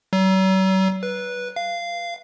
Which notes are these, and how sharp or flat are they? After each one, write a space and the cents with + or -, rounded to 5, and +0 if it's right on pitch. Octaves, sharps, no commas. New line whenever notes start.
F#3 +45
B4 -10
F5 -15